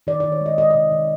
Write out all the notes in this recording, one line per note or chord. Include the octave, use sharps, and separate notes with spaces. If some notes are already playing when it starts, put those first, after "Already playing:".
D#3 D5
D#3 D5
C#5
G#3 D#5
G#3 D#5
C3 D#5
D#3